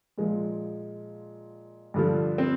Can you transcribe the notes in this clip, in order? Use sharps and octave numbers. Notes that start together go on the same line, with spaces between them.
A#2 F3 G#3
G2 D3 F3
C4